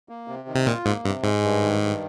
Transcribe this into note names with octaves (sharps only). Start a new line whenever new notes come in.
A#3
C3
D#3
C3
A#2 F4
G#2 A#3
G2 C3
G#2 G#3
G2
D#3
G2